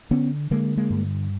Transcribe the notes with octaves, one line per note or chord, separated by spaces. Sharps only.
D3 B3 C#4
D3 G#3 A#3
G#3 A#3
G2